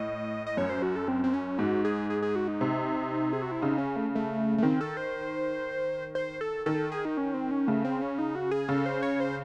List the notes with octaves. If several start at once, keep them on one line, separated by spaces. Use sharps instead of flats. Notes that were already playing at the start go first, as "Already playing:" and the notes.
Already playing: A2 D#5
D#5
F#2 C#5
C5
F#4
A4
C4
C4
C#4
G#2 F#4
G#4
G#4
G#4
F#4
D#4
C3
G#4
F#4
E4
C#3 D#4
C#4
A3
A3
A3
D#3 C4
A4
C5
C5
A4
D#3 A4
G#4
D#4
C#4
C4
C#4
C#3 A3
C4
C#4
D#4
F#4
G#4
C#3 A4
C5
C#5
C5